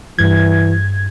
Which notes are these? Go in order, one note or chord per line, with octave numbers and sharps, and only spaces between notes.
G2 E3 G#6